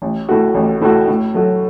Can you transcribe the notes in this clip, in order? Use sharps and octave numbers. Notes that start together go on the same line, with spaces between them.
A1
A2 A3 F#4
A1
A2 A3 F#4
A2
F#3 A3 F#4